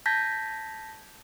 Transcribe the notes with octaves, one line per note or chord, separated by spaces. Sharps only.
A5 G6 G#6 A#6 B6